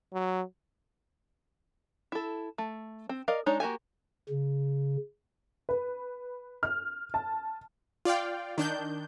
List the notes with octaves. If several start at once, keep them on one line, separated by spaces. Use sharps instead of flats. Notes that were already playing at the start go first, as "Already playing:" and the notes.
F#3
E4 A4
A3
C4
A#4 D5 D#5 F5
G#3 D4 D#4 C#5
A#3 F#4 G4 G#5
C#3
B4
F6
A5
F4 D5 F5 G5
D#3 D4 G6